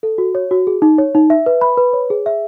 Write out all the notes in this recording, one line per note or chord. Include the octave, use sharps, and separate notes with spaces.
A4
F#4
C#5
F#4
G#4
D#4
C#5
D#4
E5
B4
B5
B4
C#5
G#4
E5